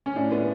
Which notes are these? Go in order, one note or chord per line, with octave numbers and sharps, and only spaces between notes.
C#4
A2 D4
B3